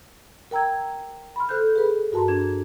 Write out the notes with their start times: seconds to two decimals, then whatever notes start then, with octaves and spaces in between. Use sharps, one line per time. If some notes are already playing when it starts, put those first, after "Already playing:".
0.51 A#4 G5 A#5 E6 G#6
1.36 B5 C6 F6
1.49 A4 C5 F#6 G6
1.76 G#4 B4 B5
2.12 G2 F#4 A#4 A5 A#5 C6
2.28 D4 G#6